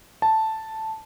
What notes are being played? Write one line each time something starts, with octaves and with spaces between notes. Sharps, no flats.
A5